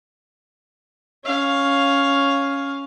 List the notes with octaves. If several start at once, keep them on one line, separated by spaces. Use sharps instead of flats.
C#4 F5